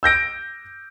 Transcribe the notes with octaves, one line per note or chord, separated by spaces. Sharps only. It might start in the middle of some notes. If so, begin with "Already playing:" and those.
E6 G6 A#6 D7